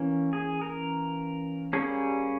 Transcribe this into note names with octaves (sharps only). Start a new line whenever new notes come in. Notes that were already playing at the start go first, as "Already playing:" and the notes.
Already playing: E3 A#3 C#4
G#4
A#4
G3 A#3 C#4 G#4